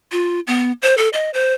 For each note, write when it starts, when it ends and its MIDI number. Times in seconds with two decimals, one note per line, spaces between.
0.12 0.40 65
0.47 0.72 59
0.82 0.95 72
0.97 1.09 69
1.13 1.30 75
1.34 1.54 72